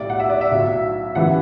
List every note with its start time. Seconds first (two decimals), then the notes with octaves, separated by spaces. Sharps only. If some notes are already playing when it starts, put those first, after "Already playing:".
Already playing: B1 A2 G3 D5
0.10 F#5
0.20 E5
0.30 D5
0.41 E5
0.52 B1 A2 F#3
1.15 G1 F#2 E3 G3 F#5